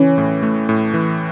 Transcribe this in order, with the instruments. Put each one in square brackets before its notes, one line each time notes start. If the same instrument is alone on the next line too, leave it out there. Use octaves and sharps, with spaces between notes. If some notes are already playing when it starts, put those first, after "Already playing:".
Already playing: [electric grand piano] E3 [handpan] C#4
[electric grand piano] A2
A3
A2
E3